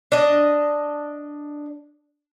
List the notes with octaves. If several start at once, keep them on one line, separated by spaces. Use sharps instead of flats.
D4 D#5